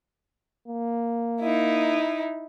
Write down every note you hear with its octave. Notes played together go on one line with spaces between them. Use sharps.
A#3
D#4 E4